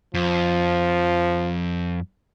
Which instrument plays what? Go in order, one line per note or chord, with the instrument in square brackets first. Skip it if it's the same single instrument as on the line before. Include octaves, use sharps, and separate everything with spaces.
[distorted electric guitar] F2 [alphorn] F3